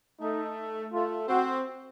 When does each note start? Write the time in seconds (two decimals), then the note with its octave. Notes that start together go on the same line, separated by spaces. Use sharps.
0.21 A3 D#4
0.93 A3 F4
1.28 C4 F#4